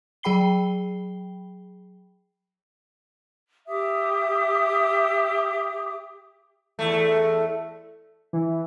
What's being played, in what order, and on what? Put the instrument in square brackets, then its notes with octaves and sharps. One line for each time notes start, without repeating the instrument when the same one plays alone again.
[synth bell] F#3 G#4 G5 B5 C7 G7
[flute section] G4 E5 D6 D#6
[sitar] E2 A3
[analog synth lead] E3